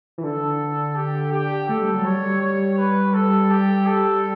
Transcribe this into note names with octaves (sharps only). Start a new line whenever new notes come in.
E3
D3 A4
G4
G4
A3 A4
G3
F#3
G3 C#5
C#5
B4
A4
G4
A4